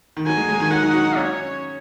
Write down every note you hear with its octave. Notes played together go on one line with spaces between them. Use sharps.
D#3
F#3 G#5
G#3
G#3
D#3
F#3 F#5
D#4
F#4
D#4
C#4 C#5